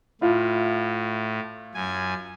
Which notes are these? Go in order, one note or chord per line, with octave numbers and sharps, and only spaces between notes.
A2 E4 F4 F5
F#2 G#5